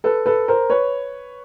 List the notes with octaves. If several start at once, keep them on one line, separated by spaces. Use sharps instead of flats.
A4 B4
A4 B4
A#4 C5
B4 C#5